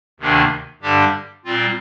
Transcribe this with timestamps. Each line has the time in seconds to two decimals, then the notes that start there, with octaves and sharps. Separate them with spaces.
0.20 D2 C3 D#3 A#3 D4
0.82 G2 D3 G3 D4 G4
1.45 A#2 G3 C4 F4